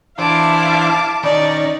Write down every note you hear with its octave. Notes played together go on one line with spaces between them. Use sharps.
E3 D4 E4 C5 F5 A5 D6
D#3 C#4 D#4 D5